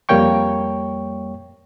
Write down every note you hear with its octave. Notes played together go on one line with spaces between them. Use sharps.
F2 G3 A#3 C#5 G5 C#6